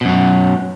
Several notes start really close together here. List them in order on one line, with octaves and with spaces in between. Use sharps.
B2 F#2 F#3